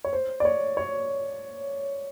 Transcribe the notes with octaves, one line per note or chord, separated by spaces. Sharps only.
C#5
C5
D5
C#5
C#5